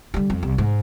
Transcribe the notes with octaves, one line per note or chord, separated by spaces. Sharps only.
D3 G3
F2
C2
G#2